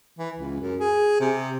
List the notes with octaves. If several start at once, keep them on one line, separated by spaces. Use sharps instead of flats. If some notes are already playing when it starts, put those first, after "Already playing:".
E3
C#2
F#2
G#4
C3